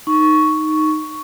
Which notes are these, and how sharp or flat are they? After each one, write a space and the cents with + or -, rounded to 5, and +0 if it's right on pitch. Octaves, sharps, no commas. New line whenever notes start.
D#4 +0 C#6 +5